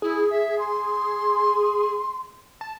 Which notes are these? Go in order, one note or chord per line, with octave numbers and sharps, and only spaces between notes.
E4 G#4
E5
C6
A5